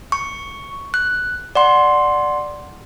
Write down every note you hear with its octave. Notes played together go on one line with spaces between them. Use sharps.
C#6
F#6
D5 F#5 C6